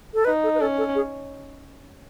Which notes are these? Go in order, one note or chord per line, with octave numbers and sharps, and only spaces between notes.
A4
D#4 B4
A4
B4
C#4 A4
A4
G#4